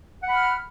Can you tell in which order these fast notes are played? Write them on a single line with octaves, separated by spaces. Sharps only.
F#5 B5 F6